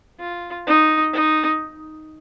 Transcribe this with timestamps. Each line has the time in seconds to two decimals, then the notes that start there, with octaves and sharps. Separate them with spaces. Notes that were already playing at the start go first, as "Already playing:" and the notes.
0.20 F4
0.67 D#4
1.13 D#4